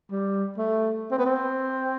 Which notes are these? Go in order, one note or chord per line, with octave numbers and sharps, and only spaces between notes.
G3
A3
C4
B3
C4